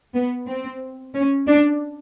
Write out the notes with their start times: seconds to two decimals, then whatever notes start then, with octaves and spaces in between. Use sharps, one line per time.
0.14 B3
0.47 C4
1.14 C#4
1.47 D4